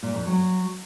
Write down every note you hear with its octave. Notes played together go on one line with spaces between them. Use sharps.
A#2
F2
F#3